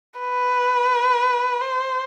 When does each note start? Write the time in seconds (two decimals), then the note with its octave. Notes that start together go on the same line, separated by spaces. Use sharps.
0.20 B4
1.62 C5